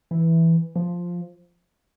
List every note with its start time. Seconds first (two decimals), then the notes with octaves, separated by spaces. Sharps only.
0.11 E3
0.76 F3